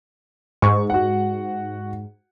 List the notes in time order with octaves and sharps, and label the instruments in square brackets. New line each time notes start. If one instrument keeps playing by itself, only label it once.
[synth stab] G#2 [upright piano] C#6
[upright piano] F#4 F#5